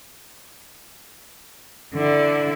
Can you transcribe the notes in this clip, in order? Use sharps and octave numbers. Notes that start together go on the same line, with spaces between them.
D3 E4